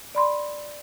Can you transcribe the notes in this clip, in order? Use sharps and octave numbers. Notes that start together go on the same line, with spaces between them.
D5 B5 C6